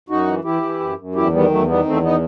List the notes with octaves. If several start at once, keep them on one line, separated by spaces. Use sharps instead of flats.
F#2 D#4 F#4
E3
E3 E4 G4
E3
F#2
F#2
E2 E4 G4
D#3 G3 B3
E2 F#3 A3
D#3 G3 B3
E2 A3 C4
D#3 B3 D#4